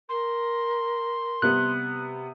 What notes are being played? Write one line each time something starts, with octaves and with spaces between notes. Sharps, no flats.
A#4 C6
C3 G3 B3 F#6